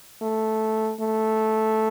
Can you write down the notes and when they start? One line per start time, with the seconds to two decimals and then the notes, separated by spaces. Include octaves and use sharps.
0.22 A3
1.01 A3